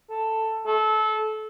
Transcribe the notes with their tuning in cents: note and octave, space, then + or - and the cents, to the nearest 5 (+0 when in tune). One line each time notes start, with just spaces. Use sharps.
A4 +10
A4 -25